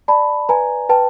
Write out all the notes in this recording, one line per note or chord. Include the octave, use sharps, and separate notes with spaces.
D5 A5 B5
B4 G#5 A#5
B4 G5 A5